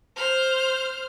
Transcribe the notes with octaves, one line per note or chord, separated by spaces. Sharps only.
C5 F6